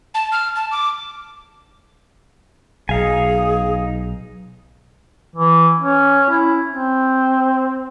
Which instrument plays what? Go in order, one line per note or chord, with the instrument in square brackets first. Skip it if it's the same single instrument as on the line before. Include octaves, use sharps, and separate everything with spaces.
[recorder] A5
F6
A5
D6
[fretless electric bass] B1 [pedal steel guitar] D#4 F5 G#5 [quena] G#4
[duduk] E3
C#4
E4
C4